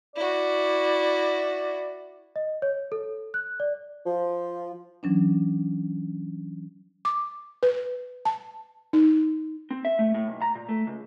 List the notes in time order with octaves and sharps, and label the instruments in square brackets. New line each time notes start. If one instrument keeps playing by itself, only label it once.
[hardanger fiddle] E4 F#4 [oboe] D5
[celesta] D#5
C#5
A4
F#6
D5
[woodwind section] F3
[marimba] E3 F#3 C#4 D4
[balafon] D6
B4
A5
D#4
[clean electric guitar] C4
E5
A3
A2
B1
A#5
A#2
A3
C#2